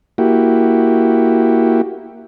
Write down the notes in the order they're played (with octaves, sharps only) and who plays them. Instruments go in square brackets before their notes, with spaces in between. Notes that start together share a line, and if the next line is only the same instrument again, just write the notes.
[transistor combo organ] A#3 E4 F#4 G4